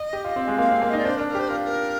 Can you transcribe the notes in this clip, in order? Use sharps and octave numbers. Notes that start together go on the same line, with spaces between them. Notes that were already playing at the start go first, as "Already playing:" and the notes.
Already playing: D#5
G4
F4
C4
G#3
A#3 F5
C4
A#3
D#5
D#4 D5
D4 C5
A#4
D4
A#4
G4 C5
F4 A#4
A#4